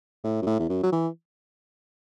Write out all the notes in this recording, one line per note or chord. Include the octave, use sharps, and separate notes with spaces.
A2
F#2
A2
E2
F#2
F#3
E3